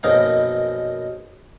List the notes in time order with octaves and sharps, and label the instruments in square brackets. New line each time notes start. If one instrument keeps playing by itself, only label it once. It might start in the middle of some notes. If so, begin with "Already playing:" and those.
[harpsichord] A#1 F#2 B2 D#4 F5